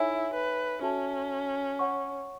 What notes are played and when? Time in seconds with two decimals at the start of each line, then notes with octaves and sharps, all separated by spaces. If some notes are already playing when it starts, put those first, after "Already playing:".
Already playing: D#4 E4 A4 C#5 E5 G#5
0.34 B4
0.82 C#4 F#4 A4 E5 A5
1.79 C#5 F#5 C#6